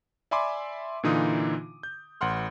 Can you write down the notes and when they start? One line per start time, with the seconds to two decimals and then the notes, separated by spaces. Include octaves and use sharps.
0.31 D5 E5 G#5 B5 C6 D6
1.03 A#2 D3 E3 D#4 F4 D#6
1.83 G6
2.21 A1 F#5 C6 F6